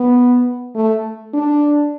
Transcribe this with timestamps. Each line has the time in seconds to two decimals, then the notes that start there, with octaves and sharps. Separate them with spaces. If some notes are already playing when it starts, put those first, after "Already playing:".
Already playing: B3
0.75 A3
1.34 D4